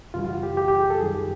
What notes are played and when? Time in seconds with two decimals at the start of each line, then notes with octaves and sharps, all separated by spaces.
0.14 F#2 C#3 E3 G3 F4
0.24 F4
0.29 F#4
0.43 G4
0.57 G4
0.68 G4
0.79 G#4
0.90 A4
1.01 F#2 D#3 G3 G#4
1.15 G4